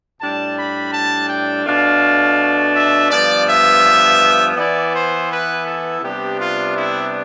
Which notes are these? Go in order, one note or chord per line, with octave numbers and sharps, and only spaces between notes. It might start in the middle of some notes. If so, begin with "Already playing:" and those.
A2 G3 D4 A5
B5
A5
G5
B2 A3 D4 F5
E5
G2 F3 B3 D5
E5
E3 B3 E4 D5
C5
B4
A4
C3 G3 B3 D4 G4
F4
E4